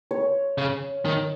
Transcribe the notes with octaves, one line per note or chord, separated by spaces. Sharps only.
C#5
C#3
D#3